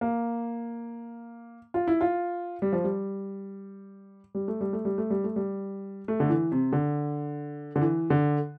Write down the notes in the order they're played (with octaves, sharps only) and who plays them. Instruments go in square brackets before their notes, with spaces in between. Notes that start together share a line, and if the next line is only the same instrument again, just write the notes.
[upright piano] A#3
F4
E4
F4
G3
F3
G3
G3
A3
G3
A3
G3
A3
G3
A3
G3
A3
D3
E3
C3
D3
D3
E3
D3